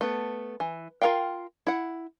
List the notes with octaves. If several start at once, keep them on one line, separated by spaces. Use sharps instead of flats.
A3 B3
E3
F4 A4 A#4 F5 G5
E4 F#5